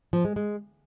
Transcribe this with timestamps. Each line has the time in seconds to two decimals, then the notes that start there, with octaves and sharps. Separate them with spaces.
0.13 F3
0.25 G#3
0.36 G#3